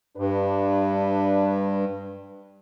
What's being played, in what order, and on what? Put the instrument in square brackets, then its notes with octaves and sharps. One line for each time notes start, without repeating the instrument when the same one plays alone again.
[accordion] G2 [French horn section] D4 B4